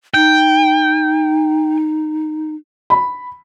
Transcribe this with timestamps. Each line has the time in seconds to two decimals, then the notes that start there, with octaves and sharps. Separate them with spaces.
0.14 D#4 G5
2.90 B5